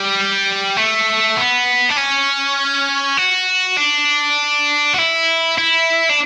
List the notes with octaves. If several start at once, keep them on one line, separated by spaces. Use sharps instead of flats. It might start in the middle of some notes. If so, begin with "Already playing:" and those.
Already playing: G3
A3
B3
D4
C#4
F#4
D4
F#4
E4
E4
D4